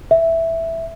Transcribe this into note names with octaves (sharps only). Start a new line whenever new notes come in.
E5